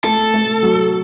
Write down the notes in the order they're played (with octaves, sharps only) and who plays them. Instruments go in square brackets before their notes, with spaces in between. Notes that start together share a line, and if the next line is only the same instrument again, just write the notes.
[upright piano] A3 [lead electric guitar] A4
[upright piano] A3
F#3